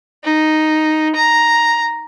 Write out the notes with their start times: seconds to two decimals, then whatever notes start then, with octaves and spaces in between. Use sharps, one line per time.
0.24 D#4
1.15 A#5